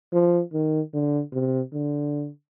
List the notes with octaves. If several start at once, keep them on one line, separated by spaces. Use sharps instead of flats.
F3
D#3
D3
C3
D3